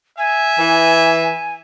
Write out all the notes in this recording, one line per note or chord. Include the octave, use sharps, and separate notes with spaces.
E5 G#5
E3